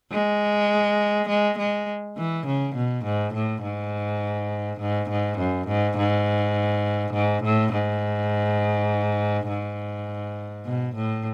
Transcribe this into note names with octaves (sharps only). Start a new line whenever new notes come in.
G#3
G#3
G#3
E3
C#3
B2
G#2
A2
G#2
G#2
G#2
F#2
G#2
G#2
G#2
A2
G#2
G#2
B2
A2